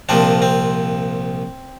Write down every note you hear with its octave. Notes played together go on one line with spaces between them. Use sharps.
C2 A#2 F3 C4 D4
C4